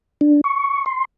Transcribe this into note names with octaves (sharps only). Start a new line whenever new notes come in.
D4
C#6
C6